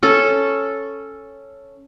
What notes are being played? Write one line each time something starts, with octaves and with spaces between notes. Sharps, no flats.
C#4 A4